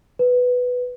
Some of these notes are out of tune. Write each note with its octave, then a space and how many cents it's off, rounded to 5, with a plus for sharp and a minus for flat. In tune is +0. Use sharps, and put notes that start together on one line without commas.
B4 +5